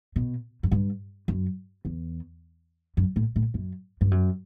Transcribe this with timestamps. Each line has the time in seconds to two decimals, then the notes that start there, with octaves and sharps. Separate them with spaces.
0.16 B2
0.63 F#2
0.71 G2
1.28 F#2
1.85 E2
2.97 F#2
3.16 A2
3.36 A2
3.54 F#2
4.01 G2
4.11 F#2